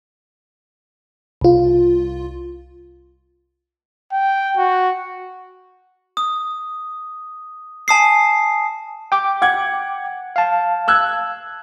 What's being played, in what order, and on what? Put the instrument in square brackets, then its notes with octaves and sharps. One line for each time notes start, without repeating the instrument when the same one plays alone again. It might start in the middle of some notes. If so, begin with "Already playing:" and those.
[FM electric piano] C2 F4
[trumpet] G5
F#4
[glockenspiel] D#6
G#5 A5 D#6 C7
[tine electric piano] G5 D6
[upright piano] F#5 G#6
[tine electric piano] F5 A5
[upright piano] E6 F#6 G#6